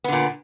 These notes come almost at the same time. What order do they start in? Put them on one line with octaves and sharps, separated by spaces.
B3 D3 A#2